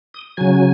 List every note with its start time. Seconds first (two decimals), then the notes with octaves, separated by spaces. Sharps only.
0.14 D#6
0.37 C#3 F#3 G#5